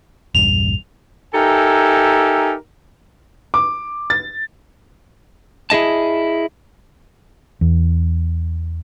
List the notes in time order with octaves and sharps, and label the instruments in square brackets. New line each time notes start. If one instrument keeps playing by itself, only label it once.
[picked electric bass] A#1 E2 G2 [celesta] F7
[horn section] D#4 G4 A4 A#4 E5 G#5
[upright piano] D6
A6
[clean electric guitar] E4 G#4 D#5 A5
[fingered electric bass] E2